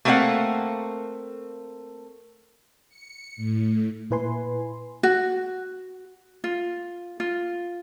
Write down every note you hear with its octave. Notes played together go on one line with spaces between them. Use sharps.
A3 A#3 C4 A4 F5 F#5
C#7
A2
A#2 E4 B4 G#5 C6
F#4
F4
F4